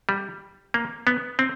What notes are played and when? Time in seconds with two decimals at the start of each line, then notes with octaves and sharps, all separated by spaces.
0.09 G3
0.74 A#3
1.07 B3
1.39 C4